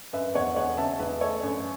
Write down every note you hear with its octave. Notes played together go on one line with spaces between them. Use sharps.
F#2 B4 E5
E2 C#5 F#5
E1 C#5 F#5
C#3 E5 A5
E1 B4 E5
A3 A4 C#5
F#2